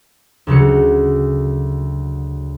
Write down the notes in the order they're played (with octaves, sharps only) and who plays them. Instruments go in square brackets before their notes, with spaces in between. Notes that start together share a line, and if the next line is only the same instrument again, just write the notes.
[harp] D2 C#3 F#3 C#7